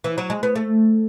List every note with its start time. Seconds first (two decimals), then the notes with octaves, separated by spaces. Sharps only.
0.04 E3
0.18 F#3
0.30 G#3
0.43 B3
0.56 A3